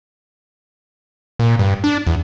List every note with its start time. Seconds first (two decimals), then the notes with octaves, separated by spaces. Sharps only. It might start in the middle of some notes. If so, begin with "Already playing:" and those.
1.39 A#2
1.59 G2
1.84 D4
2.07 E2